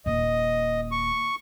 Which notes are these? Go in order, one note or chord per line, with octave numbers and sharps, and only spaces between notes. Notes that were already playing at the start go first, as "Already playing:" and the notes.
D#1 A#2 D#5
C#6